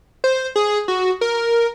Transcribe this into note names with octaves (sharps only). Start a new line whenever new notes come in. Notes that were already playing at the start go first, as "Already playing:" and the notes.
C5
G#4
F#4
A#4